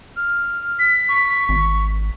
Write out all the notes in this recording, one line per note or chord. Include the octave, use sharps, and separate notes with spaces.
F6
B6
C#6
G#1